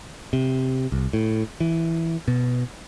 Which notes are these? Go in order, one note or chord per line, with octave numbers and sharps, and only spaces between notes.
C3
C2
A2
E3
B2